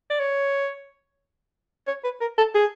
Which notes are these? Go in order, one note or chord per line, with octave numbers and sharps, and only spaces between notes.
D5
C#5
C#5
B4
A#4
A4
G#4